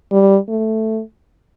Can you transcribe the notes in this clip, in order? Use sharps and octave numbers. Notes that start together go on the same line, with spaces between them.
G3
A3